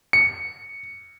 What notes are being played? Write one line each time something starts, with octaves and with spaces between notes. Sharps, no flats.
C#7